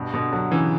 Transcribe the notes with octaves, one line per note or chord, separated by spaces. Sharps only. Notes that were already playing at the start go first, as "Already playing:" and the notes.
Already playing: G2 B2
B2 D3
D3 F#3
C#3 E3